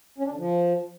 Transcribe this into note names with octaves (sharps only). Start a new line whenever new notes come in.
C#4
D4
D3
F3